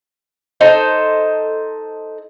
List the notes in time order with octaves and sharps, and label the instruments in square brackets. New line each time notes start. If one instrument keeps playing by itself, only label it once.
[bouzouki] D#4 A4 C5